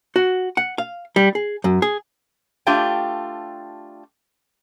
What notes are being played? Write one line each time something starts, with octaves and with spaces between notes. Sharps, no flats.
F#4
F#5
F5
G3
G#4
F#2
G#4
A3 D4 F4 G4 G5